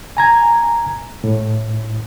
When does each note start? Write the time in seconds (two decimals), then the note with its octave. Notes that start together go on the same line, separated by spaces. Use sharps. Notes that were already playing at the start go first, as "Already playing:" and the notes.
0.17 G#5 A#5 G#6
1.24 A2